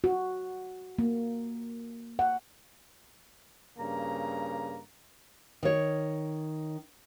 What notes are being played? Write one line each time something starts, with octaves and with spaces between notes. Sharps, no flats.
F#4
A#3
F#5
G2 C#3 A#3 A#5
D#3 C#5